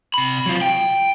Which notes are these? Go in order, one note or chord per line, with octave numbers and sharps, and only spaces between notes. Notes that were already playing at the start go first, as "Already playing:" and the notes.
C3 B5
F#3 F4
G5